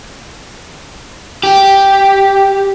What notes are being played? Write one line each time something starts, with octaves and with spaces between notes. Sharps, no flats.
G4